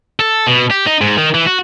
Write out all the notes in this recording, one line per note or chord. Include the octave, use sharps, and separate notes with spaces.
A4
B2
G4
D#4
G#2
D#3
E3
F#4